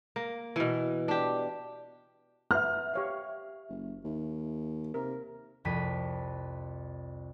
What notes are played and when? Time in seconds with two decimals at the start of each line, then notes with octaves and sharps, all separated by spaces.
0.16 A#3
0.56 B2 E3
1.08 D4 G4
2.51 B4 E5 F#5 F6
2.94 G4 C#5 F5
3.69 F#1
4.04 D#2
4.94 C3 A#4
5.65 C2 F2 B6 D#7